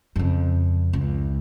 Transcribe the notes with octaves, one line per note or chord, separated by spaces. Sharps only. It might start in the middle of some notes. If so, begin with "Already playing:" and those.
F2 C#3
C#2